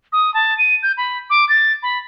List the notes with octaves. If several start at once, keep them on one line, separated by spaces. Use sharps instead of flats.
D#6
A5
D#7
G6
B5
D6
A6
B5